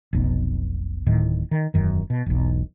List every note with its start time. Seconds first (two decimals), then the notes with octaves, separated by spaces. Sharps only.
0.13 F1 B1 B2
1.06 D1 A2 D#3
1.51 D#3
1.74 E1 F#2 D#3
2.10 B2
2.26 E1 B1